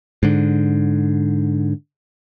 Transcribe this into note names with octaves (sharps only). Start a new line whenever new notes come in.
G#2 D3